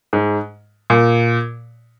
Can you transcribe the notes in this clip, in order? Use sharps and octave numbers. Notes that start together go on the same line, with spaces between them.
G#2
A#2